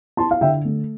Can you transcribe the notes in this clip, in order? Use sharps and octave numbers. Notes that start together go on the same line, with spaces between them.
E4 A5 C6
F5
D3 E5 G5
A3